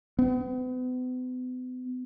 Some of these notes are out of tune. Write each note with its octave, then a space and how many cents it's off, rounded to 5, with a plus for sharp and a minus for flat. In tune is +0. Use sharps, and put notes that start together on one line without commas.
B3 +40